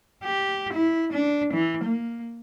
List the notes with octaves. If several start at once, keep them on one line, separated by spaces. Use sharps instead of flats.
G4
E4
D4
E3
A#3